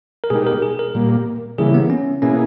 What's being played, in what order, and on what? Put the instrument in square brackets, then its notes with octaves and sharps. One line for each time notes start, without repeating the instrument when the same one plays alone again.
[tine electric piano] A#4
[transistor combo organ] B2 G#3 D#4 G4 [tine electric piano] G#4
[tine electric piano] A#4
G#4
A#4
[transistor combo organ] A#2 G3 A#3
[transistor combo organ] C#3 E3 G3 A#3 E4 [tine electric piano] G#4
[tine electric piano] B3
C#4
[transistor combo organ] B2 A#3 E4 G#4 [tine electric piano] C#4